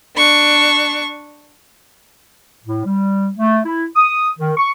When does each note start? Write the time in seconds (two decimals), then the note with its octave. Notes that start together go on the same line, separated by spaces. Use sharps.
0.16 D4 C#6
2.63 A2
2.85 G3
3.37 A3
3.65 E4
3.95 D#6
4.39 D#3
4.57 C#6